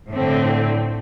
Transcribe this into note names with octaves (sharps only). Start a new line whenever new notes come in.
A2 D3 C4